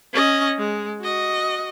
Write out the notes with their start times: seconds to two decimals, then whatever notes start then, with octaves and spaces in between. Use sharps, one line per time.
0.13 C#4 D#5
0.59 G#3
1.01 F#4 D#5